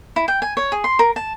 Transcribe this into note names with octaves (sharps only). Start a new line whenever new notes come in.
E4
G5
G#5
C#5
G#4
C6
A#4
A5